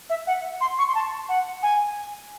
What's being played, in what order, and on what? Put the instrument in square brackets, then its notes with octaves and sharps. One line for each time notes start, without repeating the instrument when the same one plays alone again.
[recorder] E5
F#5
C6
C#6
C6
A5
F#5
G#5